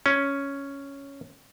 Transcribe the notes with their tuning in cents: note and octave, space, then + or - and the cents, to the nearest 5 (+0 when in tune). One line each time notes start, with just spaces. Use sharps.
C#4 +5